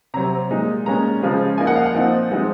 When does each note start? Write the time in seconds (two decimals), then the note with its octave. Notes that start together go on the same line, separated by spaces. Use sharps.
0.14 C3 F#3 C4 A#5
0.51 A#2 G#3 D#4
0.86 A#2 G#3 C#4 A#5
1.22 C#3 F3 G#3 C#4
1.58 F3 A#3 D#4 G#5
1.67 F#5
1.76 F5
1.86 F#5
1.94 A#2 F3 C4 D#4
2.30 F3 G#3 C4 D#4